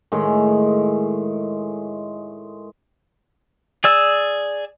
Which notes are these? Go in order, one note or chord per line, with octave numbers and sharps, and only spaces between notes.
A2 D#3 G#3
G#4 D5 E6